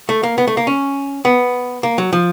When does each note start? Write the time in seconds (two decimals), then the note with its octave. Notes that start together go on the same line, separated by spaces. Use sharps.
0.09 A3
0.23 A#3
0.38 B3
0.47 A3
0.57 A#3
0.67 C#4
1.25 B3
1.83 A#3
1.98 F#3
2.13 F3